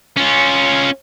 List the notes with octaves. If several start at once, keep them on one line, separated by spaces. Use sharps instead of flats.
C#4 F4